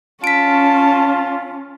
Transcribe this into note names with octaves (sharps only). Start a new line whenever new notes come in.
C#4 F4 A5 B6 D7